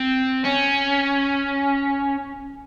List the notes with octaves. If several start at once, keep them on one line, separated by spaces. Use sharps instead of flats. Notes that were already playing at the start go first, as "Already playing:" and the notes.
Already playing: C4
C#4